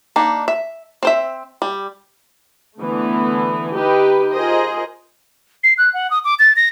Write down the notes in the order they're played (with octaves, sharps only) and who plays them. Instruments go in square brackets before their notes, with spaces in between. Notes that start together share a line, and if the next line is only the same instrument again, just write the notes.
[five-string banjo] A#3 D4 D#4
E5
C4 C5 E5
G3
[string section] D3 E3 A3 B3
D#4 G4 B4
F4 G#4 A#4 C5 D#5
[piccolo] C7
F#6
F#5
D#6
D6
A6
A#6